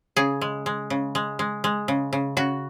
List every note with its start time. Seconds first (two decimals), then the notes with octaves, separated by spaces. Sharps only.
0.16 C#3 G#4
0.41 G#3
0.66 G#3
0.90 C#3
1.15 G#3
1.39 G#3
1.64 G#3
1.88 C#3
2.13 C#3
2.37 C#3 F#4